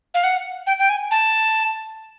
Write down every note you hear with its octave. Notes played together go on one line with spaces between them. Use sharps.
F5
F#5
G5
G5
G#5
A5